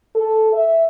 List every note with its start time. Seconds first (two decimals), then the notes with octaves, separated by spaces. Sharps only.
0.16 A4
0.53 E5